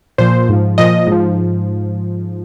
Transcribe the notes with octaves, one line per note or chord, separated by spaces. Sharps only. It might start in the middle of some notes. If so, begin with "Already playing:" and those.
A#2 F3 C5
G#2 F3
A#2 F3 D#5
G#2 F3